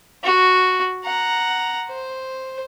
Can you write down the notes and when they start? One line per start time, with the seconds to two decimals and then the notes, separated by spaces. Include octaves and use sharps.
0.24 F#4
1.04 F#5 A#5
1.89 C5